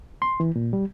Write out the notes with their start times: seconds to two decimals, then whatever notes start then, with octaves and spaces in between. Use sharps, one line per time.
0.22 C6
0.40 E3
0.56 A#2
0.73 G3